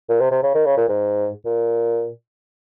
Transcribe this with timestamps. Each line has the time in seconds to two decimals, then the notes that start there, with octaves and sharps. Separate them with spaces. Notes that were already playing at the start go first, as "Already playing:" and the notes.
0.09 A#2
0.20 C3
0.31 C3
0.43 C#3
0.55 D#3
0.66 C#3
0.77 A#2
0.89 G#2
1.45 A#2